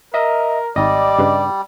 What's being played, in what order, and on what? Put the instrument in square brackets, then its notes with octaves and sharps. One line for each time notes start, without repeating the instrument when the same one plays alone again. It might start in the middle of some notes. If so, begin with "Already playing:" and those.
[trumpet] A#4 [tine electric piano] D#5 E5
[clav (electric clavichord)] G#1 D#4 [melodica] G3 [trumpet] D5 [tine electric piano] D#5
[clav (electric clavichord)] G2 C#3 B4